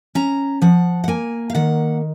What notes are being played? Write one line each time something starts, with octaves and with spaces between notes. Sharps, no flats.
C#4 A#5
F3 F#5
F#5
A#3 G#5
F5
D#3 F#5